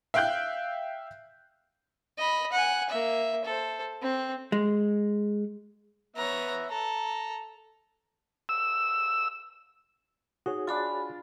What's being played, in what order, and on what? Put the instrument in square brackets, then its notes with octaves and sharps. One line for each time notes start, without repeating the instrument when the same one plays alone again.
[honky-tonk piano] E5 F5 G5 F#6 G6
[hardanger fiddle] D#5 B5
F#5 G#5
A#3 E5
A4 C5
C4
[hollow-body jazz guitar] G#3
[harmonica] B3 E5 [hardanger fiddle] C#5 A#5
[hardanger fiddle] A4 [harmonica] A#5
[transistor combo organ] E6
[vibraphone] D#4 [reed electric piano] F#4 G#4 C#5
[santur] D4 F4 [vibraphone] G#5 B5